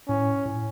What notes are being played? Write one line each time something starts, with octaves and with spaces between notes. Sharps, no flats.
A2 C#4
A2